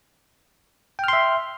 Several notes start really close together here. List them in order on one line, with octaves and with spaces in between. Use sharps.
G5 F6 C6 E5